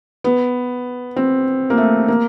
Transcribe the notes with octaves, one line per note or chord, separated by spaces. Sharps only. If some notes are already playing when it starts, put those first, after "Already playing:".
B3
C4
A#3
A3
A#3